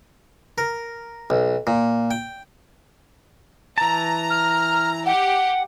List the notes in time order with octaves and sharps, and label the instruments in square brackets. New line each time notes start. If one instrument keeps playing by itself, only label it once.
[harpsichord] A#4
B1
A#2
G5
[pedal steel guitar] E3 A5 [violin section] A#5
[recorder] F6
[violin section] G4 [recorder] F#5